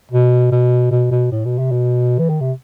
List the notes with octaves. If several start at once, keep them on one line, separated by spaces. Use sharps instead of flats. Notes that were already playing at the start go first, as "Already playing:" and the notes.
B2
B2
B2
B2
A2
B2
C3
B2
E3
D#3
C3